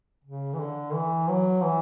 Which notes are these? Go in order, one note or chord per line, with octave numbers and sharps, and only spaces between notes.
C#3
E3
D3
E3
F#3
E3